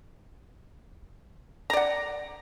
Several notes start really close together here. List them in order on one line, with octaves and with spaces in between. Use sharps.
A#5 D5 F#5